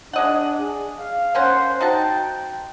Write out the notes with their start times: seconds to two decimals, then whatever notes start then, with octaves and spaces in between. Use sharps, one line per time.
0.13 G#3 D4 D#5 F#5
0.59 G#4
0.99 F5
1.35 A#3 C#4 C5 F#5
1.81 D#4 F#4 G5 A5